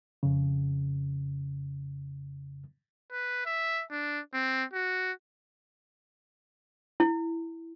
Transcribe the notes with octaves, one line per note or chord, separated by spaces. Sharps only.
F2 C#3
B4
E5
D4
C4
F#4
E4